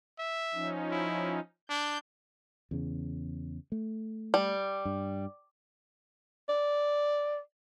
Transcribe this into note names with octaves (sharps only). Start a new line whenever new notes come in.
E5
F3 C#4 D#4
E4
D4 G6
E2 C#3
A3
G3
G2
D5